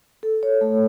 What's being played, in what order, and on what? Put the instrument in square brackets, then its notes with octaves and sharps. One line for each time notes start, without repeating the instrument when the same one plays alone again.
[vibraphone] A4
C#5
A3